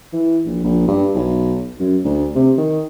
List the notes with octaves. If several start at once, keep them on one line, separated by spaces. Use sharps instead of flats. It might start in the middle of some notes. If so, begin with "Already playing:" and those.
E3
A#1
A#1
G2
B1
F#2
D2
C3
D#3